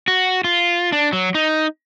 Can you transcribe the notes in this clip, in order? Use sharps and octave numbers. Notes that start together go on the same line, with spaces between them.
F#4
F4
D4
F#3
D#4